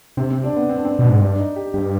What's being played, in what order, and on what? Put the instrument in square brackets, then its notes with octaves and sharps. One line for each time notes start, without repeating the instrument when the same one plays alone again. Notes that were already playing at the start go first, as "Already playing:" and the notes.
[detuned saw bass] C3 [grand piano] C4
[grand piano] C4
D4
B3
C4
D4
C4
[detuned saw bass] B2
G#2
[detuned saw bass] G2 [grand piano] D4
[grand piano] D#4
G4
[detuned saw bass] G2 [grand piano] G4